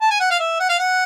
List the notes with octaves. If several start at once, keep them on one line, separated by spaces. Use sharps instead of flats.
A5
G#5
F#5
F5
E5
F#5
F5
F#5